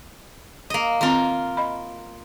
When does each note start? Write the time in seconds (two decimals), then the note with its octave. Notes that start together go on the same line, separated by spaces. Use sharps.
0.70 A#3 D#5
1.01 D#3 C4 F4 A#4 A#5
1.57 D#5 B5